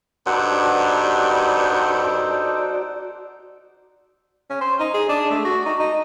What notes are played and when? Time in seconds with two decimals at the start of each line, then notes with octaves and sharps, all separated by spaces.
0.26 G2 D#4 F#4 A4 C5 D5 F#5
4.50 C#4
4.61 C5
4.80 D#4
4.94 G#4
5.09 D4
5.30 A3
5.45 F#4
5.66 D#4
5.79 D#4